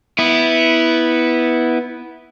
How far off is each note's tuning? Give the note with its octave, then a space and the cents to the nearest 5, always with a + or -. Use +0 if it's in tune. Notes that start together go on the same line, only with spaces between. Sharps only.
B3 +0 E4 -10